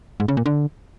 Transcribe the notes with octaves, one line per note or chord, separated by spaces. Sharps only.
G#2
C#3
A#2
D3